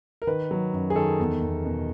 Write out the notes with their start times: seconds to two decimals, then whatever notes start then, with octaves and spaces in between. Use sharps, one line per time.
0.22 A#4
0.27 D#3 B4
0.51 F#3
0.73 F#2
0.90 G#4
0.95 D#3 A4
1.19 E2
1.42 E2
1.65 B2